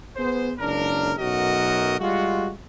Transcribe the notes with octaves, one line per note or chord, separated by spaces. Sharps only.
B3 G#4 C5
F#1 C#2 D4 A#4
B1 F#2 F#4 A#4 D#5
G3 G#3 F4 F#4